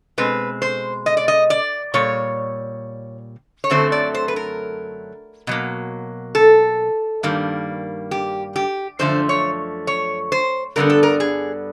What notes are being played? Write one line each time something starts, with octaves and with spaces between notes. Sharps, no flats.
B2 G#3 C4 B4
C5
D#5
D5
D#5
D5
A#2 G3 C#5
C#5
F#2 D3 F#3 A3 C4 C5
D5
C5
B4
A#4
B2 F#3 A#3
A4
G2 D#3 G3 A#3
G4
G4
F#2 D3 F3 A3 C5
C#5
C#5
C5
G2 D3 G3 B3 A#4
A4
A#4
G#4